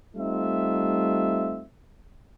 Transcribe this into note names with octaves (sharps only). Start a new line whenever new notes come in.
G3 A3 C4 D#4 F4 E5